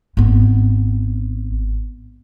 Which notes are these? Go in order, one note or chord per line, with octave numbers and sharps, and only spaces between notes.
G#1 B3